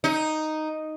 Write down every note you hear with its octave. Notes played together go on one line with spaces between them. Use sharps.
D#4